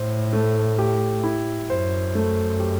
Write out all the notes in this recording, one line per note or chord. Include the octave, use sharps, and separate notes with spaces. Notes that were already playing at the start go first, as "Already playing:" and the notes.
Already playing: A2 C5
A3
G4
E4
F#2 C5
A3
G4